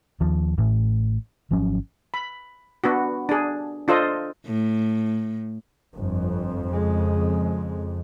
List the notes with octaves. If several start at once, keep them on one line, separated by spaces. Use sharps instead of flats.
D#2 F3
A1 A2 E3
G#1 F3 F#3 C#4
B5
B3 D4 F#4
D4 G#4
D4 F4 A4 C5 D#5
A2
G1 F2
C#3 G#3